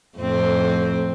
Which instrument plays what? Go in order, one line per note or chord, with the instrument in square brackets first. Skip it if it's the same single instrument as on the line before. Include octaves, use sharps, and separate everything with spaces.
[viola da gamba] F2 A2 C4